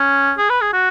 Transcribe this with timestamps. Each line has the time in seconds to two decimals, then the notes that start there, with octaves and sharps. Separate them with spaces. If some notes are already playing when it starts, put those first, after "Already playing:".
Already playing: C#4
0.38 G#4
0.50 B4
0.61 G#4
0.73 F#4